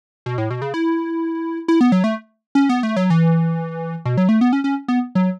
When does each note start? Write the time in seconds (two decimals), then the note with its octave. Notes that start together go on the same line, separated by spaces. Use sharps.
0.26 B2
0.38 A2
0.50 B2
0.62 C#3
0.74 E4
1.68 E4
1.81 B3
1.92 F#3
2.04 A3
2.55 C#4
2.69 B3
2.83 A3
2.96 F#3
3.10 E3
4.05 B2
4.17 F#3
4.29 A3
4.41 B3
4.53 C#4
4.64 C#4
4.88 B3
5.15 F#3